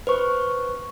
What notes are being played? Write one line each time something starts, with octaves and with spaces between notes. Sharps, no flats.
B4 C5 C#6